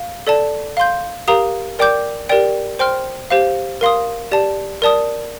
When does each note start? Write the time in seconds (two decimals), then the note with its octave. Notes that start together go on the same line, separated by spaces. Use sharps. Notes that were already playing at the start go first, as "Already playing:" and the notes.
Already playing: F5
0.27 A4 D5 A5
0.77 F5 C6 G6
1.28 G4 A#4 F5 A#5 D#6
1.79 A#4 D5 G5 D6 G6
2.29 G4 A#4 D5 G5
2.79 C5 G5 C6 F6
3.30 G4 C5 F5
3.81 A#4 F5 C6 D#6
4.32 G4 D5 A5
4.82 A#4 D5 A5 D#6